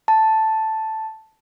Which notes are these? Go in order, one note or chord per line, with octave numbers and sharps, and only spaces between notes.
A5